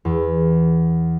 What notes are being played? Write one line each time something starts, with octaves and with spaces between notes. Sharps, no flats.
E2